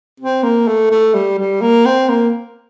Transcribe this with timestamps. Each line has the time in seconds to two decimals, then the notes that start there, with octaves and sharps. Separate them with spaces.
0.20 C4
0.43 A#3
0.68 A3
0.91 A3
1.14 G3
1.38 G3
1.61 A#3
1.86 C4
2.09 A#3